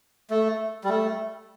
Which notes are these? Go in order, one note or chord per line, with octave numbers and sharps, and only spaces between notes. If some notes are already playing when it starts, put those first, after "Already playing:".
A3
G3
A3